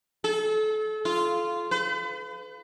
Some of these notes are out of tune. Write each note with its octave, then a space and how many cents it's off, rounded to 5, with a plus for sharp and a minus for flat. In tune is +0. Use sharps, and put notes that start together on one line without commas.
A4 -35
F4 -10
B4 +40